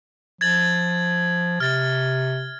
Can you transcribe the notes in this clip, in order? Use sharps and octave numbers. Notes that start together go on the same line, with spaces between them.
F3 G#6 A6 F#7
C3 F6 A6